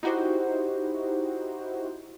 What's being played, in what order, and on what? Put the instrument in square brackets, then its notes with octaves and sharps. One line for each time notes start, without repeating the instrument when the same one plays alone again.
[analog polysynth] D#4 E4 F#4 G4 C5